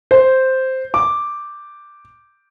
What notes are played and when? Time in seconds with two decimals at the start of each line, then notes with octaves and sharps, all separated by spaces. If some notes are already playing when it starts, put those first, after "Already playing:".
0.11 C5
0.94 D6